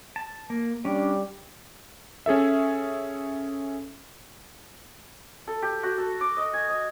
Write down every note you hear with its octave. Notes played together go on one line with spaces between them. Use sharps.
A5
A#3
G3 C#4 D4
C#4 G#4 A4 E5
A4
G4
F#4
A4
D6
D#5
G#5
D#5